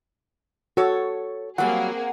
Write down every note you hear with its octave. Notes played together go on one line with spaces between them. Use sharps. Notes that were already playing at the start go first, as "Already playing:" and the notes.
F#4 A4 C#5
F#3 G3 A#3 C4 G#4 F#5